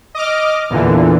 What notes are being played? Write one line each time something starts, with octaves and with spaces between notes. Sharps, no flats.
D#5 D6 F6
E2 A#2 D3 E3